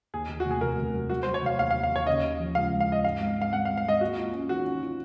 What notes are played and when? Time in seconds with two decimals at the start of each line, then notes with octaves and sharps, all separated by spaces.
0.13 D#2 G#4
0.29 D#2
0.40 F#4
0.46 F1
0.51 G#4
0.61 F1 A#4
0.78 F1
0.94 F#3
1.10 F#3 F#4
1.23 C5
1.26 F#3
1.34 C#5
1.42 F1 F5
1.58 D#2 F5
1.71 F5
1.75 F#3
1.83 F5
1.92 D#2 C#5
2.07 C#3 D#5
2.23 C#3
2.40 F3
2.55 C#2 F5
2.71 G#3
2.81 F5
2.88 G#3 D#5
3.04 G#2 F5
3.20 G#1
3.37 G#1 F5
3.52 G#1 F#5
3.65 G#1 F5
3.78 F5
3.85 G#1 D#5
4.01 A#3 F#4
4.17 F4
4.33 C#4
4.49 D#3 F#4
4.65 C#4
4.83 F4